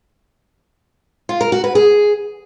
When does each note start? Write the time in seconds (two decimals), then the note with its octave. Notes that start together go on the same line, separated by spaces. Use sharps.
1.29 F4
1.41 A#4
1.52 F#4
1.64 B4
1.75 G#4